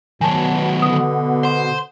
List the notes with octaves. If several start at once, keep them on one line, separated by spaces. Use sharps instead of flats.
B2 D#3 F#3 G#5 A5
D3 D#6
C5 C6